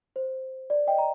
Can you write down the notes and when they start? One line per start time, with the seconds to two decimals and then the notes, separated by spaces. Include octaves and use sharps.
0.16 C5
0.70 D5
0.87 D#5 G5
0.98 A#5